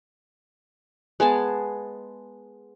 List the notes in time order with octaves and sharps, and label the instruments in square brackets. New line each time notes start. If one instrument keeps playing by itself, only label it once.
[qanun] G#3 B3 G#5 A5